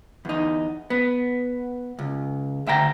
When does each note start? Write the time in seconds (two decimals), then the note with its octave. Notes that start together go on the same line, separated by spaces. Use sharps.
0.25 E2 D#4
0.90 B3
1.99 C#2
2.67 D2 E5 G5 A#5